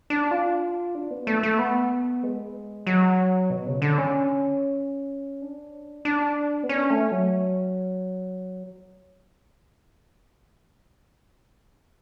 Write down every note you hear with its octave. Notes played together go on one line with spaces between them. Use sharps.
D4
F4
D4
B3
A3
A3
B3
G#3
F#3
B2
C#3
D3
C#4
D4
D4
B3
C#4
A3
F#3